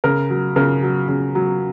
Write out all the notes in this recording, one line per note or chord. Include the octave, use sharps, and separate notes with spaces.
C#3 A#4
F#3
C#3 A#4
F#3
C#3
F#3